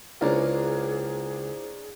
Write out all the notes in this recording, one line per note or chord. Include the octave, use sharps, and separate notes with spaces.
C#2 A#3 C#4 D4 E4 G#4 C5